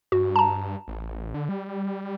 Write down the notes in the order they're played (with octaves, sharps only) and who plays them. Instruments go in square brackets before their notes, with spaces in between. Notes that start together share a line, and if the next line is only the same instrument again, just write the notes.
[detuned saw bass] G2 [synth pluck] F#4
[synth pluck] A5 A#5
[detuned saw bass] A1
D3
G3